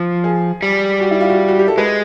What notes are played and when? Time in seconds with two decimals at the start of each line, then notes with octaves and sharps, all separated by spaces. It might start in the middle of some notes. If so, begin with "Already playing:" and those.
Already playing: F3
0.24 G#4
0.63 G3
1.00 F#4
1.11 E4
1.21 F4
1.29 F#4
1.48 F#4
1.59 G4
1.68 A4
1.78 G#3 B4